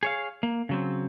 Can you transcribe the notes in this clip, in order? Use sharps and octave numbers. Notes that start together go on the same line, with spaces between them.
G#4 C#5 F5
A#3
C#3 F#3 C4